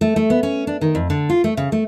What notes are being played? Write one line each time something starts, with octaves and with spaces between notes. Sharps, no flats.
A3
A3
B3
C#4
D4
D#3
F2
D3
F4
A3
C#3
A3